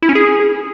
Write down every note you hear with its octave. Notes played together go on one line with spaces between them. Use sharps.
E4
C#4
G#4